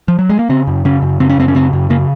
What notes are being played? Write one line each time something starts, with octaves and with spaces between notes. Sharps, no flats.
F3
F#3
G#3
A#3
C#3 C4
F#2
C#3 C#4
F#2
C#3 C4
C#4
F#2 C4
C#4
C#3 C4
F#2
C#3 A#3